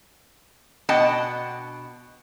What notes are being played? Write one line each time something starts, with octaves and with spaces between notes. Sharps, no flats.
B2 D4 D#5 F#5 G5 A5